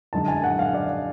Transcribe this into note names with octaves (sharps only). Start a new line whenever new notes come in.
F#2 D3 G#3 A5
G#5
F#5
F5
D5